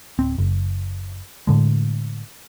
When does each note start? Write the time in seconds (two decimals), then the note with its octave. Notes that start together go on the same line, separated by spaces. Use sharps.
0.19 D1 C4
0.38 F#1
1.47 A2 D3 G#3